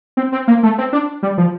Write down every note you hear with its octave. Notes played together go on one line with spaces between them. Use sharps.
C4
C4
A#3
A3
C4
D4
G3
F3